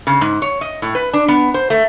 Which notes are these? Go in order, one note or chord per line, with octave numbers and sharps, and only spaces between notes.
C#3
G#2
C#5
D#5
A2
B4
D4
B3
C5
A3